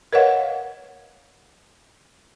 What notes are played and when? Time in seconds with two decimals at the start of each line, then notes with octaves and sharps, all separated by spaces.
0.13 A#4 B4 C#5 D#5 F5 F#5